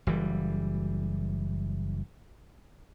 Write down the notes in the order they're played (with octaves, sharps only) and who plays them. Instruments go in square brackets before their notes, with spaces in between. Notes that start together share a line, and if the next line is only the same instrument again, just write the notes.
[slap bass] F#1 E3 G3